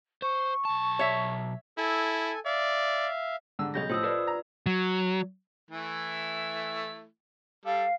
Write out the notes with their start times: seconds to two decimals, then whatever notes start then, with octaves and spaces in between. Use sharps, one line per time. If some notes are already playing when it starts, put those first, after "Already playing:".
0.22 C5 C#6
0.65 B1 A5
0.99 C#5 E5
1.78 E4 A4 G#5
2.45 D5 E5 F5
3.59 G#2 D3 E6
3.74 B1 C#3 D#5 G6 A#6
3.90 A2 F3 C5 D#6 E6
4.03 F4 A4 B4 D5
4.27 A#5
4.66 F#3
5.71 E3 A3 E4
7.65 G3 A4 F5